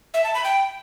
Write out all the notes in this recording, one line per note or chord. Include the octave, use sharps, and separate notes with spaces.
E5
A5
B5
G5